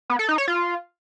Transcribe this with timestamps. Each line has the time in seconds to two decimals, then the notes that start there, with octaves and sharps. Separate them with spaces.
0.10 B3
0.19 A4
0.29 D#4
0.38 C#5
0.48 F4